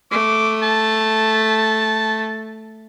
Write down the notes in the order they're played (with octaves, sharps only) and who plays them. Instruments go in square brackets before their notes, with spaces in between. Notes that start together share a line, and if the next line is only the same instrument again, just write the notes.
[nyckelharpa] A3 [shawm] D6
[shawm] A5